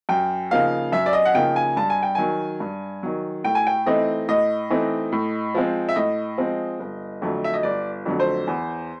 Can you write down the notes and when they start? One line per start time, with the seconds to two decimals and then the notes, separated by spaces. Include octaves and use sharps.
0.09 F#2 G5
0.51 C#3 F3 A#3 D#4 F5
0.92 F#2 E5
1.06 D5
1.13 D#5
1.25 F#5
1.34 C#3 F3 A#3 D#4 G5
1.56 G#5
1.77 G2 A5
1.90 G#5
2.03 G5
2.15 D#3 F#3 G#5
2.60 G2
3.03 D#3 F#3
3.44 A2 G5
3.55 G#5
3.67 G5
3.86 E3 A3 C4 D#4 D#5
4.29 A2 D#5
4.70 E3 A3 C4 D#4
5.12 A2
5.55 F3 G#3 C4
5.89 E5
5.96 A2 D#5
6.38 F3 G#3 C4
6.80 G1
7.22 F2 D3 F#3 A3
7.44 E5
7.54 D#5
7.63 G1 D5
8.06 F2 D3 F#3 A3
8.20 C5
8.47 E2